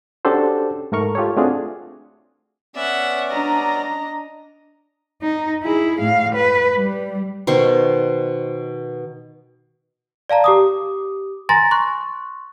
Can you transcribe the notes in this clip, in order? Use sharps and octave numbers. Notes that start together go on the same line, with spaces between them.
C#4 D4 F#4 G4 A4 C5
G#2 A3 A#4 C#6 F6
F4 G4 A4 C#5
A3 C4 D4 F4 F#4 G#4
B3 C#4 D5 E5 F#5
D4 D#5 A#5
D#4
E4 G#4
A2 F5
B4
G3
B2 D#3 C5 C#6
D5 F5 A5 A#5
G4 D6 D#6
G#5 A#5 C6 A6 A#6
C6 C#6 F#6